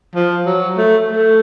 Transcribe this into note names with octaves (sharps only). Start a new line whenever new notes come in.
F3
F#3
A3
A3